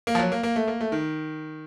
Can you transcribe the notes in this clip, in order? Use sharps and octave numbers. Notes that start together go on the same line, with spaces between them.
A#3
F3
F#3
A#3
A#3
A3
A#3
A3
D#3